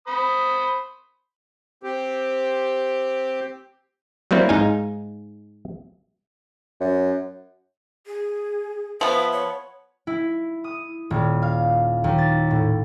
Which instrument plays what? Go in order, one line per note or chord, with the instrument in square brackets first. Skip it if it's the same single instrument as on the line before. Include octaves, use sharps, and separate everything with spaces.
[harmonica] C5 B5 D#6
[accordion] C4 G4
[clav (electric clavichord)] F#3 G3 A#3 C4 E4
G#2 D#4 F5 G#5
[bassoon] F#2
[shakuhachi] G#4
[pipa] F3 B3 [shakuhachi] E5
[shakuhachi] C#5
[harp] E4
D#6
D#1
F5
D#2
A6
A2